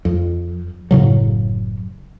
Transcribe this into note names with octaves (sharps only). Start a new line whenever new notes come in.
F2
F#1 A2 C#3 F#3